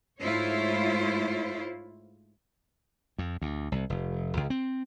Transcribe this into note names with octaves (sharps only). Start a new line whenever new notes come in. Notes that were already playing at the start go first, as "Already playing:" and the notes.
G#2 A3 E4 F4 C5 C#5
F2
D2
C2
F1
C#2
C4